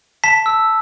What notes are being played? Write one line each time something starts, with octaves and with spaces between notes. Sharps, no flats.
A5 B6
E6